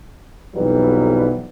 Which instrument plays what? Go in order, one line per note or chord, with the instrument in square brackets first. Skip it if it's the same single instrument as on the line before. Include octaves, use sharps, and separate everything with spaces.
[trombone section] B1 F2 E3 F#3 G3 B4